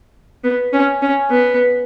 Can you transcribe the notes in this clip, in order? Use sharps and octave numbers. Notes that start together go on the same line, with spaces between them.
B3
C#4
C#4
B3